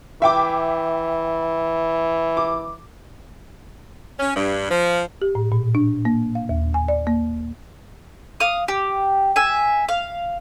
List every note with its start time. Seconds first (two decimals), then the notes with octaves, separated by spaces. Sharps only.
0.22 E3 E5 G5 D6
2.37 D6
4.19 C#4
4.36 G2
4.70 F3
5.22 G4
5.35 A2
5.52 A#2
5.75 D4
6.05 A#3
6.35 F5
6.49 D#2
6.74 G#5
6.88 D5
7.07 A#3
8.40 F5 D#6
8.68 G4
9.36 E5 G#5
9.89 F5